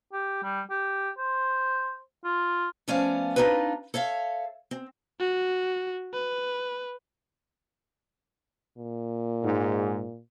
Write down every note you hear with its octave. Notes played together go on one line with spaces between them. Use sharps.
G4
G3
G4
C5
F4
F3 A3 B3 C#4 D5 F5
C4 D4 D#4 F4 B4
A4 C#5 E5 F5
C4
F#4
B4
A#2
G#2